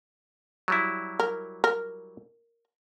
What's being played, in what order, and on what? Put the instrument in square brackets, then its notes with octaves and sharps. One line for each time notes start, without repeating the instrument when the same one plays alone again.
[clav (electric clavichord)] F#3 G3 E4
[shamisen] A#4
A#4